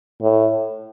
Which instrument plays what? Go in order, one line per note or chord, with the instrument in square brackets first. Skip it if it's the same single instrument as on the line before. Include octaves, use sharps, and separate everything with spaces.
[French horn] A2